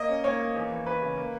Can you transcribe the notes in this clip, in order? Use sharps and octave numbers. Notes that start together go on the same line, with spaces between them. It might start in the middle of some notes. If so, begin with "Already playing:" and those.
Already playing: A#3 D#5
C#4
A#3 C#5
A#3
E2
E3
E2 B4
C#3
A#3